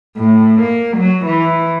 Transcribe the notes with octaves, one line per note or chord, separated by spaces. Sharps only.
A2
A#3
F#3
E3